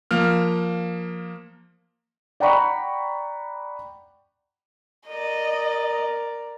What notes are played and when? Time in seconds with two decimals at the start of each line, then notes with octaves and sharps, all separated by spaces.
0.11 F3 A#3 F6
2.40 D5 F#5 G5 A#5 B5 C#6
5.08 A#4 D5 D#5